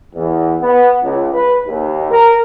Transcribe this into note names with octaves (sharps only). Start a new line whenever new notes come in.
E2
B3
C#2
B4
D#2
A#4